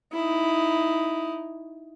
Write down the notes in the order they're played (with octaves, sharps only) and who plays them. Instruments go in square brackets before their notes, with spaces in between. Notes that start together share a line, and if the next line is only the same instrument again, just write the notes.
[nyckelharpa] D#4 E4